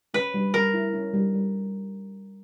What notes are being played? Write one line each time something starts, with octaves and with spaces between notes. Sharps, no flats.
C#4 B4
G3
G3 A#4
E4
C#4
G3
G3